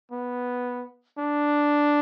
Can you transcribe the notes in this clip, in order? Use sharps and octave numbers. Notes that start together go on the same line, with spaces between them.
B3
D4